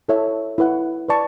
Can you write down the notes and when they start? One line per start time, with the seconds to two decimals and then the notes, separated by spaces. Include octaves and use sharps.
0.08 E4 A4 C#5 E5 A5
0.58 E4 B4 F#5
1.08 B4 D5 A5 C#6